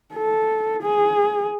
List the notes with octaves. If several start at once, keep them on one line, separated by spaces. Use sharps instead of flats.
A4
G#4